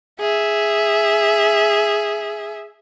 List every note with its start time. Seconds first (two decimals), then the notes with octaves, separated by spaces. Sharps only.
0.20 G#4 E5